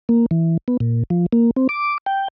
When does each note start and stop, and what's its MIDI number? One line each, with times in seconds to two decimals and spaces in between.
0.09 0.26 58
0.31 0.57 52
0.68 0.77 59
0.80 1.03 46
1.10 1.26 53
1.33 1.51 58
1.56 1.67 60
1.69 1.98 86
2.06 2.28 79